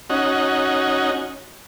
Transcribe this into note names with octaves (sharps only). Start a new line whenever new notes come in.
C#4 D#4 F#4